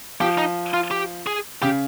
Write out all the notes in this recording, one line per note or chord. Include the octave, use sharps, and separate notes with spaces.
F3 G4
D#4
F4
G4
G#4
C#3 G4